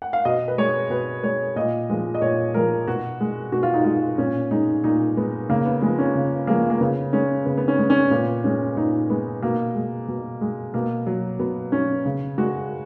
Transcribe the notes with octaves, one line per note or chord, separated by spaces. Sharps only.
F#5
F5
B2 D#5
B4
G#3 C#5
B2 B4
G#3 C#5
A#2 D#5
F3 G#3
D#5
A#2 C#5
F3 G#3 A#4
B2 F#4
G#3
B2 F#4
F4
D#4
G#3 F4
A#2 C#4
G#3 D#4
A#2 D#4
G#3 B3
C#3 A#3
B3
F3 G#3 B3
C#4
C#3
F3 G#3 A#3
A#3
C#3 B3
G#3 C#4
C#3 B3
B3
C#4
G#3
C#4
A#2 B3
G#3 C#4
A#2 D#4
G#3 B3
B2 A#3
G#3
B2
G#3
B2 A#3
F#3
B2 B3
F#3 C#4
C#3
G#3 F#4